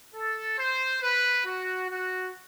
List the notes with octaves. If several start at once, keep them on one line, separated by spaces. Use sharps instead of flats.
A4
C5
B4
F#4
F#4